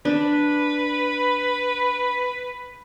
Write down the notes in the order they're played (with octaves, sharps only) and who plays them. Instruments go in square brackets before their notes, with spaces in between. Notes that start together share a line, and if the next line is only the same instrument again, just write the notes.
[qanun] D4 [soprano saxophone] B4